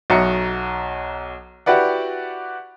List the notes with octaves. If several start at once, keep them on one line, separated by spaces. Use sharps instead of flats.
B1 F#4 D#5 E5 A#5 C#7
E4 F#4 G4 B4 D5 F#5